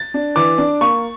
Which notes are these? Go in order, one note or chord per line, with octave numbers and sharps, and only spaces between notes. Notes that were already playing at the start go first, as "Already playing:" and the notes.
Already playing: A6
D4
E3 D6
D4
A#3 C#6